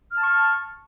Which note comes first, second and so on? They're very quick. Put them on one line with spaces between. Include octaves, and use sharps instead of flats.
F6 A5 C#6